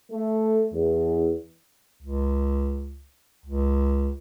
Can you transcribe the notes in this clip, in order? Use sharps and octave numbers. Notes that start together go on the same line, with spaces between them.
A3
E2
C#2
C#2